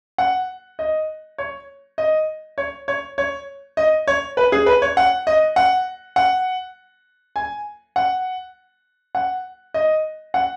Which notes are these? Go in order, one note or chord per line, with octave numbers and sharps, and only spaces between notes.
F#5
D#5
C#5
D#5
C#5
C#5
C#5
D#5
C#5
B4
G#4
B4
C#5
F#5
D#5
F#5
F#5
G#5
F#5
F#5
D#5
F#5